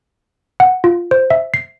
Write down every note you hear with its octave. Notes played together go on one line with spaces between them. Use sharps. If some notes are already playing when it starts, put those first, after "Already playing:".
F#5
F4
C5
E5
C7